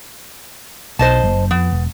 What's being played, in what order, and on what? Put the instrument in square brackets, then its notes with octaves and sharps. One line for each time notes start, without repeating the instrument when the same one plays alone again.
[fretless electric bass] B1 [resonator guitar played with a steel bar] C5 D#5 A5
[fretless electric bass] F#1
[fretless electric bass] F2 [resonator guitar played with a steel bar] B3
[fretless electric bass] E1